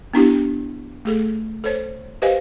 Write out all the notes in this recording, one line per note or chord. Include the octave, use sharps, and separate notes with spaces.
B3 D4 E4 G4
A3 G#4 A4
A4 C5 C#5
G4 B4 C5 D#5 F5 G#5